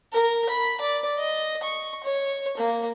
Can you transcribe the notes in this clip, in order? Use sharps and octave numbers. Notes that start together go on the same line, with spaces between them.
A#4
B5
D5
D#5
C#6
C#5
A#3